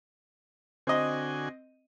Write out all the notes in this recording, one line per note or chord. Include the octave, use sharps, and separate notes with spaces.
D3 C4 F#4 D#5 G#5